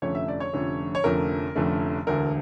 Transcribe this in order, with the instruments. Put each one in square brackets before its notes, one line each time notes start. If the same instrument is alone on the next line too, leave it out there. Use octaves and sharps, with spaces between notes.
[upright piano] F1 F2 D3 A3 C#4 C#5
E5
D5
C#5
F1 F2 D3 A3 C#4
C#5
F1 F2 D3 A3 C#4 A#4
F1 F2 D3 A3 C#4
E1 D2 D3 A#4